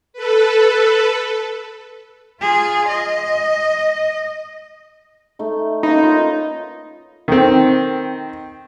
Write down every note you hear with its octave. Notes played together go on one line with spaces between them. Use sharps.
A4 B4
F4 G#4
D#5
A3 D#4
A#3 C#4 D#4 B4
F4 D#5
D#3 C4